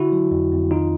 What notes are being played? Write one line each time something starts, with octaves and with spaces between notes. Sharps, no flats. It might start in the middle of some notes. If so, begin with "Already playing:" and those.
Already playing: D3 E4 F#4
F#3
F2
F2
D#3 D#4 F4